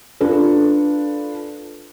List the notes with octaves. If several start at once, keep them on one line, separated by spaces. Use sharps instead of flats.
D4 F4 A4 B4